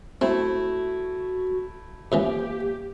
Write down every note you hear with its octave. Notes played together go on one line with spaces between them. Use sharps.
A3 C4 E4 F#4
F2 C#3 E3 A#3 G4